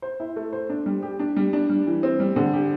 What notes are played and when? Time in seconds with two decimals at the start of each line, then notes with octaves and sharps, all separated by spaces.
0.02 C5
0.20 E4
0.36 A3
0.53 C5
0.70 D4
0.86 G3
1.03 G4
1.20 D4
1.36 G3
1.53 D4
1.69 G3
1.87 E3
2.03 C4
2.20 G3
2.36 D3
2.53 G4